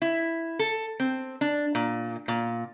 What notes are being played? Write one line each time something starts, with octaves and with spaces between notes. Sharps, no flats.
E4
A4
C4
D4
A#2
A#2